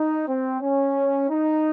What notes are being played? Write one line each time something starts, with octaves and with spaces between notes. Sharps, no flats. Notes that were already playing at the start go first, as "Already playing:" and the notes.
Already playing: D#4
C4
C#4
D#4